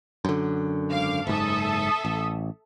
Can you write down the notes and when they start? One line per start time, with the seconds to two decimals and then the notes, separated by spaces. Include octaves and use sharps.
0.25 F#2 D3
0.89 G#1 F5 D6
1.27 F#1 G#2 A4 E5 D#6
2.05 A1